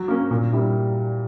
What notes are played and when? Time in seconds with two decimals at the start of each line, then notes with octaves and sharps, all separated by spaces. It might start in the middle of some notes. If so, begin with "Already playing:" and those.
Already playing: F#3
0.08 A#3 C#4
0.31 A#2
0.53 G3 A#3 E4